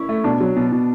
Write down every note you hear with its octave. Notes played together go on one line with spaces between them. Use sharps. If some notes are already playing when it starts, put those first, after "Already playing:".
Already playing: C#4 E4
A3
B2 D4
F#3
B2
B2